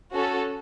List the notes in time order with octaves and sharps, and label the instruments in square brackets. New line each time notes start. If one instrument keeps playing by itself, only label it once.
[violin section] C#4 F#4 A4